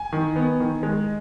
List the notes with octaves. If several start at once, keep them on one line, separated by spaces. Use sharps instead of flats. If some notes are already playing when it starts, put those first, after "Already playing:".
Already playing: G#5
D#3
B3
D#3
G#3